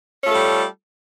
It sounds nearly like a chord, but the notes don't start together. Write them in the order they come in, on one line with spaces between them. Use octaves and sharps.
C#4 F4 A3 A4 G3